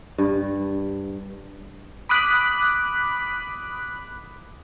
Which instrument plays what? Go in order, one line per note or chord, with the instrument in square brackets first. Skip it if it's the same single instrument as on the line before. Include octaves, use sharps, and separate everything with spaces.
[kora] G2
[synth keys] B5 D6 D#6 F#6 B6